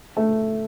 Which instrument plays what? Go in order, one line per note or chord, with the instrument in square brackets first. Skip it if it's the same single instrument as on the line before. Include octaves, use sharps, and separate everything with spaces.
[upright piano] A3